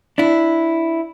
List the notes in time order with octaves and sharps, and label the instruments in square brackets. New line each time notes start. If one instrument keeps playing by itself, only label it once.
[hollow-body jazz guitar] D4 E4